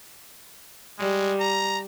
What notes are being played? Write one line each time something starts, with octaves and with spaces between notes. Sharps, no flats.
G3 G#3
A#5